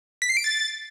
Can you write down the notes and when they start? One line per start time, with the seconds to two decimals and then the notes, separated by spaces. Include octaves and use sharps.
0.22 B6
0.29 C7
0.37 D7
0.44 A6